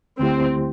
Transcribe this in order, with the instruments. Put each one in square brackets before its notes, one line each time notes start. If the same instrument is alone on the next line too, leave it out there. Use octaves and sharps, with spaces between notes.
[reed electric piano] D2 D3 A3 E4 G4 [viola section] C4